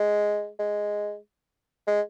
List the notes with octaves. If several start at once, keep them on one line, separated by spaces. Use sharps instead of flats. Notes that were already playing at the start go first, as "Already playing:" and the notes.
Already playing: G#3
G#3
G#3